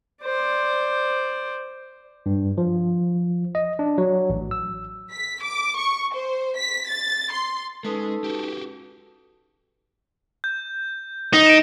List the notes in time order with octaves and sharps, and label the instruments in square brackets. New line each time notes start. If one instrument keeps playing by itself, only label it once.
[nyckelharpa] C5 D5
[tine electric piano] G2
F3
D#5
D4
F#3
A1
E6
[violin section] B6
D6
C#6
C5
B6
A6
C6
[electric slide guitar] G#3 [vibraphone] C#4 D#4 B4 [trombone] A4
[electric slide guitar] F#4 G4
[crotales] G6
[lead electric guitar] D#4
[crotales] D7 E7